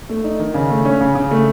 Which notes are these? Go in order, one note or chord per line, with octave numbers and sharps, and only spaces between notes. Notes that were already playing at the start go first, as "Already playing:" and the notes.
A3
D#4
D#3
C#3
A3
C#4
C#3
C#3
A3